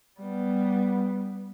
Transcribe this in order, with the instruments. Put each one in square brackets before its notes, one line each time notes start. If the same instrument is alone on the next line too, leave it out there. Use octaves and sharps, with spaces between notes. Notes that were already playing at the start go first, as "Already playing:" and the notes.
[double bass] G3 B3